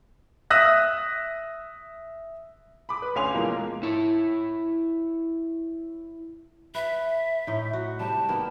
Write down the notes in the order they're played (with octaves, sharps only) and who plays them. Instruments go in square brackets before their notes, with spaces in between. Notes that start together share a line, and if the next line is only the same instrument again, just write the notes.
[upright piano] E5 D#6 E6 F#6 A#6
[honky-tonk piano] B5 D6 D#6
B4
D2 C#4 F5 G#5 C6 F7
B2 E3 F3 G#3 A#3
[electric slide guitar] E4 C#5
[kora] B4 [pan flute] E5
[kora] A2 D#4
F#4
[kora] C3 G3 [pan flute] A5
[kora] D#3 A#3 B3